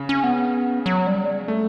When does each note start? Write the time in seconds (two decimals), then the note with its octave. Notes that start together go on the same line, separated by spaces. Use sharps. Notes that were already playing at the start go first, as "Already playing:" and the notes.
Already playing: C#3
0.09 C#4
0.23 B3
0.86 F#3
1.07 G3
1.48 A3